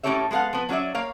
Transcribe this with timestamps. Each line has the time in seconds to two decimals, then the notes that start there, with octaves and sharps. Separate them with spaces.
0.03 A2 C#4 G4 A4 C#5 E5
0.31 G#3 B3 A4 F5 F#5
0.53 F3 B3
0.69 F#3 C#4 F#4 G#4 D5 E5
0.95 A#3 C#5 F5